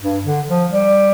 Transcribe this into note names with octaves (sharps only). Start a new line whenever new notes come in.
G2
D3
F3
G3